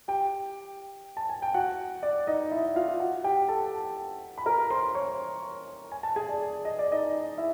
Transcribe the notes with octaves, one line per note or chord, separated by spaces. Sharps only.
G4 G5
A5
G#5
G5
F#4 F#5
D5
D#4 D#5
E4 E5
F4 F5
F#4 F#5
G4 G5
A4 A5
B5
A#4 A#5
C5 C6
C#5 C#6
G#5
A5
G#4 G#5
D5
D#5
D5
D#4 D#5
E4 E5